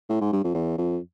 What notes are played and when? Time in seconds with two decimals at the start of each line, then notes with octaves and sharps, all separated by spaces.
0.10 A2
0.21 G#2
0.33 G2
0.44 F2
0.55 E2
0.78 F2